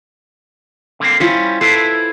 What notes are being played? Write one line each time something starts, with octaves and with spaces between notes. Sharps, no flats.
D3 A#3 C4
G3 C#4 E4 F4 C5
E4 A4 B4 C5